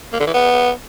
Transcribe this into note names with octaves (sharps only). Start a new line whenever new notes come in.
A#3
D3
E3
B3